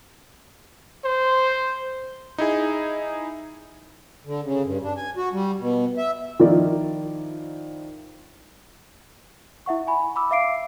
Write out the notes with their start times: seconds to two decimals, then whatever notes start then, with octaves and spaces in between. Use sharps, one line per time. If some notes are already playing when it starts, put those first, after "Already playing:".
1.05 C5
2.38 D#4 E4 G#4
4.26 D3
4.44 C#3
4.65 G2
4.83 D4
4.97 G#5
5.17 F#4
5.33 G3
5.60 B2
5.97 E5
6.39 D#3 F3 E4 F4 A#4 D5
9.66 E4 E5 F#5 C#6
9.87 G#5 B5
10.16 B5 D6 E6
10.31 E5 F5 D6 C7 D7